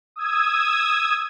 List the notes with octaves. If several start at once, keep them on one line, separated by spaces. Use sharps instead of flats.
D#6 E6 G#6